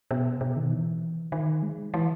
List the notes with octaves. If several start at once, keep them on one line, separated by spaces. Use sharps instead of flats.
B2
B2
D#3
E3
D#3
G#3
E3